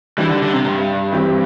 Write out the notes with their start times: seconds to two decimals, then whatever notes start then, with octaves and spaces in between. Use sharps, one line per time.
0.18 E3 G3 D4 G4
0.30 D3
0.42 D3
0.53 C3
0.65 G2
1.12 E3 C4 G4